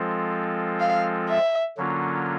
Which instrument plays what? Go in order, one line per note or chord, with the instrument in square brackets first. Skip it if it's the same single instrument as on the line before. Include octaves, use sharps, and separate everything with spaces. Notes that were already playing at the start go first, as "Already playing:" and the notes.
Already playing: [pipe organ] F3 G#3 C4 F4 A4
[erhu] F5
E5
[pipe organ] D3 F#3 A#3 C#4 F4